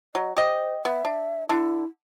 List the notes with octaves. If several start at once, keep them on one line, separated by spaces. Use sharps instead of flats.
F#3 D#5
G4 C5 D#5
B3 E5
D4
D3 D4 E4